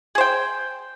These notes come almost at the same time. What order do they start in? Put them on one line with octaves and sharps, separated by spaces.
G#4 C5 G5